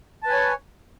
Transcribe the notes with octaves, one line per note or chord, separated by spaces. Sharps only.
B4 C#5 G#5 A5